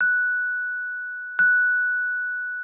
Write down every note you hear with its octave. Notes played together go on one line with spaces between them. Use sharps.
F#6
F#6